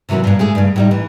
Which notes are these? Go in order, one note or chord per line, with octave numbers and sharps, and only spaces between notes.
C3 E3 F#3 A#3 C#4
G2 A#2
G#3 A3 G#4
G2 C#3
A2 G3 D#4
E3